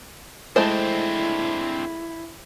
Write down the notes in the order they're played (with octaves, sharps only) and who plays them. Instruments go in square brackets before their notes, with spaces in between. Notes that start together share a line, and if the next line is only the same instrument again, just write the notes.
[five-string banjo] G#3 A3 C5 [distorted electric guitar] C4 D4 [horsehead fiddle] E4